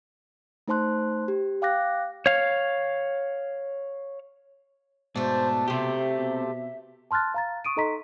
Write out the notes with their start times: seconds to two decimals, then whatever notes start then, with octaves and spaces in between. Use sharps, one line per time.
0.68 A3 D#4 C5 A5 C6 F#6
1.28 G4
1.62 F5 G5 D6 F#6 A#6
2.26 C#5 F5
5.16 G#2 B2 A3 D4 C5
5.68 C3 A3 C4 G4 E5
6.17 B2
7.11 A5 C6 F6 F#6 A6
7.34 F5 A#5 A6
7.65 C#6 D#6 D7 D#7
7.76 D#4 A4 D#5 A#5 C6 B6